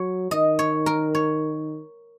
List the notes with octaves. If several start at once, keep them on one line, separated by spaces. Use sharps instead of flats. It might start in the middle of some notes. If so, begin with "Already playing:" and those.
Already playing: F#3 C#5
D#3 D#5
C#5
A#4
C#5